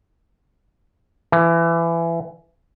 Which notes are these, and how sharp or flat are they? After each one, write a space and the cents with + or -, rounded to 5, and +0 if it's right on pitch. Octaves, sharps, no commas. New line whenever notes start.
E3 +25